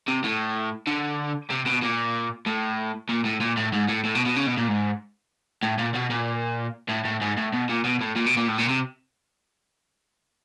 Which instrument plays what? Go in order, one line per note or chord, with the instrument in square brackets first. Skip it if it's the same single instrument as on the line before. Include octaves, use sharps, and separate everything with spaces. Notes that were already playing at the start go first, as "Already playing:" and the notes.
[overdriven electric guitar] C3
A2
D3
C3
B2
A#2
A2
A#2
A2
A#2
A2
G#2
A2
A2
B2
B2
C#3
B2
A#2
G#2
A2
A#2
B2
A#2
A2
A2
G#2
A2
B2
A#2
B2
A2
A#2
B2
A#2
A2
A#2
C3